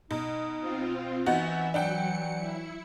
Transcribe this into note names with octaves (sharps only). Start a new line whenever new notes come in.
B2 D#4
C4 F4
E3 B3 D#4 F#4 E5
F#3 D4 F#5 G5 C#7
E4